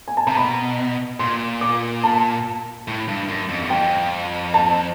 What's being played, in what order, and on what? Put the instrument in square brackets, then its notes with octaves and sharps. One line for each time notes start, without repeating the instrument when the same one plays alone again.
[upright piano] G#5
A5
[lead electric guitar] C3 [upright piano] A#5
[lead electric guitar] B2 [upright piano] B5
[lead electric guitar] A#2 [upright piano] C6
[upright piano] D6
A5
[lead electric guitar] A2
G2
F#2
F2
E2
[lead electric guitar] F2 [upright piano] G5
[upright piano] A5